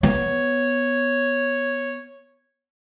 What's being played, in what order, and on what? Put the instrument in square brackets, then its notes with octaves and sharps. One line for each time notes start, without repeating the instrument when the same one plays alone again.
[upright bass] B3 [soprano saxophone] C#5